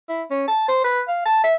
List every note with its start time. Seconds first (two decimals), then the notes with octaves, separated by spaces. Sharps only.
0.09 E4
0.30 C#4
0.48 A5
0.68 C5
0.84 B4
1.08 F5
1.25 A5
1.44 E5